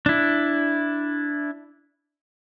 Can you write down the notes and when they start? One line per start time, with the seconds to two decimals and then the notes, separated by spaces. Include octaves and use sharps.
0.06 D4 E4